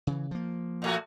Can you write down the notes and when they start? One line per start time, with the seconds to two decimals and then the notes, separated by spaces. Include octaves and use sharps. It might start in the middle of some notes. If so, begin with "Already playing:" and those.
0.07 C#3 E3
0.31 F3 A#3
0.82 A#2 A3 F#4